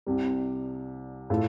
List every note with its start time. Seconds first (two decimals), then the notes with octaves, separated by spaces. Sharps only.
0.07 C2 C3 G3
1.30 A2 A3 F4